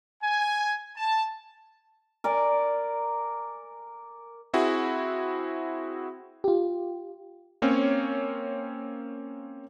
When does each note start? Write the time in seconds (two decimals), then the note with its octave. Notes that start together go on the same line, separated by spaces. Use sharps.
0.23 G#5
0.97 A5
2.24 A#4 D5 G#5
4.53 C4 E4 F#4 G#4
6.44 F4 G4
7.62 A#3 C4 C#4 C#5